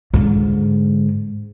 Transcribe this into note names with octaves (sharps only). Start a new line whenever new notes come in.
G#2 D3